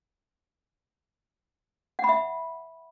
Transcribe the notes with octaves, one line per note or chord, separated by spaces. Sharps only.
E5 F#5 B5